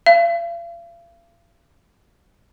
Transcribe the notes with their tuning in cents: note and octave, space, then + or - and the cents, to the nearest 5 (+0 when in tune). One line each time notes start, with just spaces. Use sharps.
F5 -40